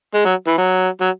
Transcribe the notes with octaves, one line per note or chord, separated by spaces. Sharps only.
G#3
F#3
E3
F#3
F#3